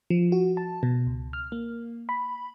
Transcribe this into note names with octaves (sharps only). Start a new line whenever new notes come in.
F3
F#4
A5
B2
C#2
F6
A#3
B5